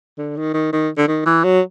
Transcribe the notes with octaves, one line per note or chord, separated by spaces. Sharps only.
D3
D#3
D#3
D#3
D3
D#3
E3
F#3